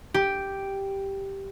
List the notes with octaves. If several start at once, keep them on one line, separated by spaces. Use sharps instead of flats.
G4